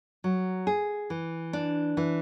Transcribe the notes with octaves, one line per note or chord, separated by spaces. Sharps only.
F#3
G#4
E3
D4
E3